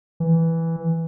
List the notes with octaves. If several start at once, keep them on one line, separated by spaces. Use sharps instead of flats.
E3